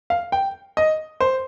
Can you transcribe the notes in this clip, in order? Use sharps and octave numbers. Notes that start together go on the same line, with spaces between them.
F5
G5
D#5
C5